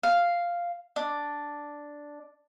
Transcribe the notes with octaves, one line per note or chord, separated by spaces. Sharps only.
F5
D4